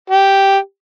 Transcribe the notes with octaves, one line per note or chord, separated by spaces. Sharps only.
G4